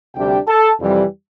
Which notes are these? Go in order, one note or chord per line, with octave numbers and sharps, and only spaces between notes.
D2 C3 G3 D4 G4 G5
A4 A5
F2 C3 E3 G3